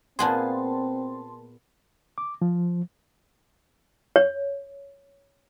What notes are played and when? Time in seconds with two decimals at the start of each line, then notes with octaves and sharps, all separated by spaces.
0.19 A#2 B3 C4 G#4 A5 C6
2.18 D6
2.42 F3
4.16 C#5